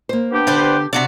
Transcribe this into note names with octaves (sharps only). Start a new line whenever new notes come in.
A#3 C5
B3 D4 G4
D3 B4 C5 D5
C3 D4 F#4 D5